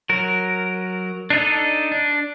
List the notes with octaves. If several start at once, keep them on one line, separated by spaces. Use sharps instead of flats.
F#3 A#4
D4 D#4 A4
D4